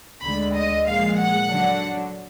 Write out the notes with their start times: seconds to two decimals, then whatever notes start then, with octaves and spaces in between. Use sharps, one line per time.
0.24 D2 D3 G#3 B5
0.55 D#5
0.86 A#2 F3 G#3 F5
1.18 F#5
1.47 D3 F#3 D4